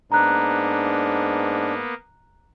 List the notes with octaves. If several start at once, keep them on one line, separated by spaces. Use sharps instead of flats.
G#2 A#3 B3 D4 A#5 F#6